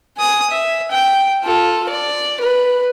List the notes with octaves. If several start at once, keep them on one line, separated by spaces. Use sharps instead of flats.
G#5 D#6
E5
G5
F4 A4
D5
B4